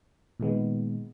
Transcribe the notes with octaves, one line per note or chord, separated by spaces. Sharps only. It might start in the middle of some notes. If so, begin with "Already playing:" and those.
A#2 D#3 G#3 B3